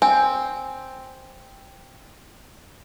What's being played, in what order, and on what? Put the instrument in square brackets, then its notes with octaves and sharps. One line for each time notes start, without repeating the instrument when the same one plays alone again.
[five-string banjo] C4 [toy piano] G#5